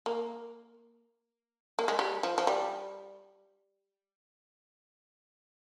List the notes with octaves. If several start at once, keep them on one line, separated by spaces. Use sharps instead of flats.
A#3
A#3
G#3
G3
F3
F3
G3